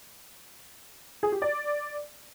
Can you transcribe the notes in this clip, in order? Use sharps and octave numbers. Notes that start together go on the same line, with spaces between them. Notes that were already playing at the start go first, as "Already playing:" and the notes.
G#4
G4
D5